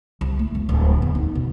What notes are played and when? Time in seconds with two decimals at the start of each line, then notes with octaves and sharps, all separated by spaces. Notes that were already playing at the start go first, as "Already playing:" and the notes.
0.21 C2
0.39 A3
0.55 E1
0.69 D1
1.02 E2
1.15 D#4
1.35 B2